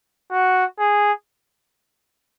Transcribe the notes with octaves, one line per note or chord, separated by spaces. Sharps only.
F#4
G#4